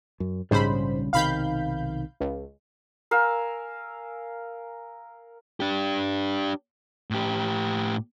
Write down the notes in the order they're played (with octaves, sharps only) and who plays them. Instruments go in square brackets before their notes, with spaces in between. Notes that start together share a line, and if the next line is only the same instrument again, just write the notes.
[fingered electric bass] F#2
[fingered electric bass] A#1 C#3 G3 [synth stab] G#2 C5 B5
[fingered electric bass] B1 C3 D#3 [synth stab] F5 B5 G6
[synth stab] C#2
[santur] A#4 F5 G#5 E6
[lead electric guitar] D4 G4
A2 G4